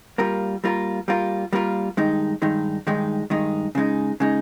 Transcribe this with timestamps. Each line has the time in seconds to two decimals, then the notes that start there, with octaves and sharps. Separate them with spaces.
0.18 G3 A#3 F4 A#4
0.64 G3 A#3 F4 A#4
1.08 G3 A#3 F4 A#4
1.53 G3 A#3 F4 A#4
1.97 G2 D#3 G#3 D#4
2.42 G2 D#3 G#3 D#4
2.87 G2 D#3 G#3 D#4
3.30 G2 D#3 G#3 D#4
3.75 C#3 G#3 D#4
4.20 C#3 G#3 D#4